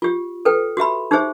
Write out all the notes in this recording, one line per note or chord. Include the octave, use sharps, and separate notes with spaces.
F4 G4
A4 B4 G5
F#4 G4 E5 B5
D#4 G4 G#4 C5 E5